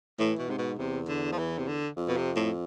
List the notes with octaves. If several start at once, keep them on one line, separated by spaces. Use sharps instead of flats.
A2 E3
B2
G#2 C3
B2
E2 C3
D3
F3
E3
C3
D3
F2
B2
C3
A2